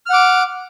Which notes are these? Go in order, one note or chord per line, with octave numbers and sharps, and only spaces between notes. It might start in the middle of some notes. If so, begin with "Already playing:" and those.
F#5 D6 F6